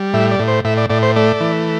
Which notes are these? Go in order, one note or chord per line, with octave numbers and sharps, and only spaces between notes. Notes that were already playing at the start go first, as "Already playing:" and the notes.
Already playing: G3
A2 E5
D5
A2
C5
A2 E5
D5
A2 D5
C5
A3 D5
E3